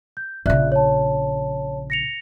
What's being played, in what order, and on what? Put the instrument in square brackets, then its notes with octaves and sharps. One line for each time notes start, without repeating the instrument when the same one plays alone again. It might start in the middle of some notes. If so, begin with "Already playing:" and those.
[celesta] G6
[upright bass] A#1 C#3 [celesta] D5 E5 F#6
[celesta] C#5 A5
A#6 C#7 F7